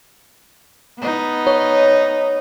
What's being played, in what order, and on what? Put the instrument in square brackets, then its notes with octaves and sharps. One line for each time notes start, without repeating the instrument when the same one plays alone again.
[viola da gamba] B3 D#4
[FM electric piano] C#5